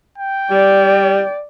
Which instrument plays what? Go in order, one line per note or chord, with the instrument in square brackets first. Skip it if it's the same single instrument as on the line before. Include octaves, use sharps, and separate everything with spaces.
[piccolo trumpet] G5
[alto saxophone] G3 [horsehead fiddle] D5